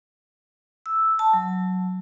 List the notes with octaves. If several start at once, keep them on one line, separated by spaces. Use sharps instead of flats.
E6
A5
F#3